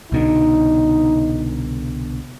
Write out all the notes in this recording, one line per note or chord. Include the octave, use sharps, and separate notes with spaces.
C2 B2 D3 D#4